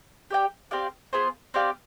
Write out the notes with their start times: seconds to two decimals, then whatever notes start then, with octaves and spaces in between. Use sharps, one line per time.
0.30 G4 D5 G5
0.71 C4 G4 D5 F5
1.13 B3 F4 G#4 C5
1.54 C4 G4 D5 F5